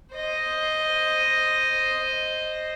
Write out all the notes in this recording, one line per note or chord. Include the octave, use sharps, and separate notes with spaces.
C5 D#5